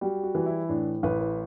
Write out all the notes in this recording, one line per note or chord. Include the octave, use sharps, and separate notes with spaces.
G3 F#4
F#4
E3 F#4
E4
A2 D4
A1 B4
B4